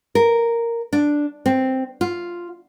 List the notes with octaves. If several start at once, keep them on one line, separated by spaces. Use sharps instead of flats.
A#4
D4
C4
F4